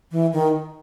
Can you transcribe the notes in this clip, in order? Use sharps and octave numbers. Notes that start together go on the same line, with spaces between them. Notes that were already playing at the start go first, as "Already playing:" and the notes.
E3
D#3